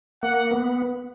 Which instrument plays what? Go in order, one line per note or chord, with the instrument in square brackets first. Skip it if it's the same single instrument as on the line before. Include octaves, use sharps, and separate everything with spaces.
[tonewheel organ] A#3 [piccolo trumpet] F#5
[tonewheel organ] B3